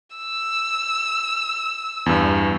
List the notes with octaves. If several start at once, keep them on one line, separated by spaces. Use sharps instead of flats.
E6
E2 G2